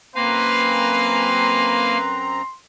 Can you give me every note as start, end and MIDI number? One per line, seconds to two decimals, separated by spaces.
0.16 2.42 42
0.16 1.98 58
0.16 2.42 60
0.16 2.30 71
0.16 1.98 77
0.16 1.98 80
0.16 2.42 82
0.16 2.54 84